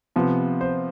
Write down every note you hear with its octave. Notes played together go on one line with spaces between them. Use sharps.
C3 F3 B3
C5